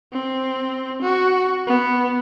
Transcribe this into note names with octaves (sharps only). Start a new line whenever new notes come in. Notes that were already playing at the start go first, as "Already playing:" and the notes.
C4
F#4
B3